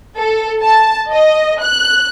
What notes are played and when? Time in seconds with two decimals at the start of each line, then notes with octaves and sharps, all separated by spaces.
0.17 A4
0.63 A5
1.12 D#5
1.62 F#6